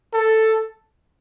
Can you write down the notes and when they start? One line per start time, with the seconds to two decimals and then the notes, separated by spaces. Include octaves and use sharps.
0.14 A4